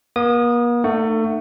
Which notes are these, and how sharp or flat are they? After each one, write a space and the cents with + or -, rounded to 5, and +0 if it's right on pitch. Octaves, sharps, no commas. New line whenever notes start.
A#3 +45 D#6 -20
A3 +25 D#4 -45 F#5 +0